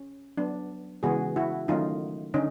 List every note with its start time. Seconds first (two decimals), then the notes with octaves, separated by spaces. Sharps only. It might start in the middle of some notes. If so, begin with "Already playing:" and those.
Already playing: C#4
0.37 F#3 B3 D4
1.03 C#3 E3 G#3 B3 F#4 G#4
1.36 E4 F#4
1.68 D#3 F#3 A3 C#4 D#4 F4
2.34 D3 C#4 D#4